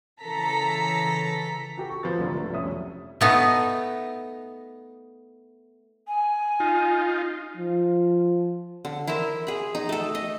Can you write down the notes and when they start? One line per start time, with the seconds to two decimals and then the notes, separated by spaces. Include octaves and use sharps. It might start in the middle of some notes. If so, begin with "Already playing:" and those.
0.21 C#3 E3 A4 A#5 B6
1.77 F#4 G4 A4
1.89 C#6
2.03 F3 B4 A6
2.18 C2 G#2 D3
2.35 A3
2.50 F1 B1 G3 C#4 E5 D#6
3.21 A3 B3 D#4
6.07 G#5
6.60 D#4 F4
7.57 F3
8.85 D3
9.07 E4 A#4 C5 E5
9.47 G#4 B5
9.75 D#4
9.89 A3 A4
10.15 D#5